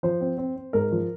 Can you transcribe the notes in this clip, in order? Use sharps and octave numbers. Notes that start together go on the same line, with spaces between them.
F3 C5
C4
C4
C4
G#2 A#4
F3